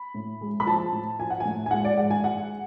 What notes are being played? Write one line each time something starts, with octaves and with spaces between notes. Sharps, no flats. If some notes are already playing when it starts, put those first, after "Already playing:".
Already playing: B5
A2
G#3
B5
F3 A5
A2
F3 G#5
F#5
G#5
A2
G#5
G#3 F#5
D5
G#2 F#5
G#5
G#3 F#5